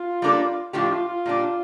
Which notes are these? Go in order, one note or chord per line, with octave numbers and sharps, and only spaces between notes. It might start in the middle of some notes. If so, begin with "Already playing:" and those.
Already playing: F4
G3 A#3 D4 A4
A2 F3 A3 D4 F4 G4
F4
F4
A#2 G3 D4